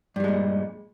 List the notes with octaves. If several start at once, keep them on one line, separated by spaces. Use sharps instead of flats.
G2 A#2 G3 G#3